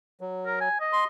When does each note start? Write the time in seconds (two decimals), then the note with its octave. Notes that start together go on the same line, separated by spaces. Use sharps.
0.21 F#3
0.46 A#4
0.60 G#5
0.80 D#5
0.93 C6